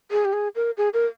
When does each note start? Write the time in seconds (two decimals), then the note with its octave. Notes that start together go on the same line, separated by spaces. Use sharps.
0.11 G#4
0.25 G4
0.33 G#4
0.55 A#4
0.77 G#4
0.93 A#4